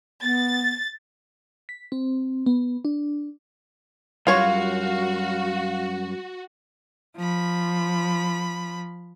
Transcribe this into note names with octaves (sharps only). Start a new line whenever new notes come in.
B3 A6
B6
C4
B3
D4
F#2 G3 F4 F#4 C#5 F5
F3 B5